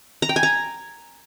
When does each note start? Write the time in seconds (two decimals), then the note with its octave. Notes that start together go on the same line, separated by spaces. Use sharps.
0.22 A#5
0.29 G5
0.36 G#5
0.43 A#5